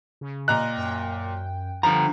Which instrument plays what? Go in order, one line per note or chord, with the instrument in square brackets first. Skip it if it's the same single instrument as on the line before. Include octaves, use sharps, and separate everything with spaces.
[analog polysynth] C#3
[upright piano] A#2 A#5 F#6 [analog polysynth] D#5
[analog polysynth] F#2 G5
[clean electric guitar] D3 A#5 [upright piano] F3